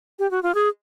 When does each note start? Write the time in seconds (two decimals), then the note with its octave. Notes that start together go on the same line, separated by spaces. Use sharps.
0.19 G4
0.31 F#4
0.43 F4
0.55 G#4